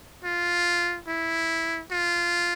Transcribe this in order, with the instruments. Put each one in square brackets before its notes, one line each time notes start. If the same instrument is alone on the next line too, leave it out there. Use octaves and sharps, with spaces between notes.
[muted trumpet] F4
E4
F4